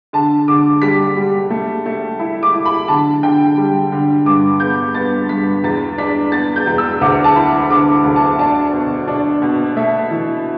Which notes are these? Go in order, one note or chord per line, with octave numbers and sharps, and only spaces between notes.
D3 A5
D3 D6
G3 B6
G3
A3
A3
E4
D6
E4
B5
D3 A5
D3 G5
G3
D3
G2 D6
B3 G6
B3 A6
G2 B6
E2 A6
D4 B6
B3 A6
G6
E2
E6
D2 D6
A5
E4 B5
D3 D6
D2
A5
D4 A5
B2
D4
B2
A3 E5
E3